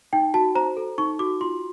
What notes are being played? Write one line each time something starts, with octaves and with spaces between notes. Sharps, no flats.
D#4 G5
F#4 A5
C5 A#5
A4
D#4 C#6
F#4 D6
F4 C6